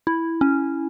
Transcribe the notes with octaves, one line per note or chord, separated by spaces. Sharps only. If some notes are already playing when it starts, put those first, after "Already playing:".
E4
C#4